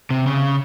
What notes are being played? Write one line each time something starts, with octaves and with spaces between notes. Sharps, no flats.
C3
C#3